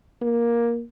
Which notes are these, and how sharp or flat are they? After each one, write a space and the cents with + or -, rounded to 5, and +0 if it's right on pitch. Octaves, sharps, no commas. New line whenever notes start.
A#3 +10